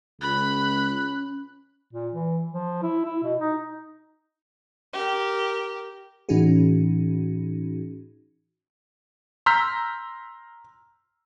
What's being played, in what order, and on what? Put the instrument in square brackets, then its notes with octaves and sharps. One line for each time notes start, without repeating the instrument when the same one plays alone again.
[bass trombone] C#2 [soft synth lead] C#4 [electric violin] B5 [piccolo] F#6
[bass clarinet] A#2
E3
F3
E4
E4
B2
D#4
[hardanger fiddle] G4 A#4
[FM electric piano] A2 E3 C#4 D#4 F#4 G#4
[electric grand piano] A#5 C6 E6 F6 G6 B6